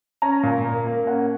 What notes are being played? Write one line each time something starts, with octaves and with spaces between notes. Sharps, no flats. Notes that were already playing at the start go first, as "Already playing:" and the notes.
C#4 A#5
A#2
A#3
A#3
C#4 F#5